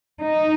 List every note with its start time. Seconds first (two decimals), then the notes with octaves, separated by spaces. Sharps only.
0.20 D#4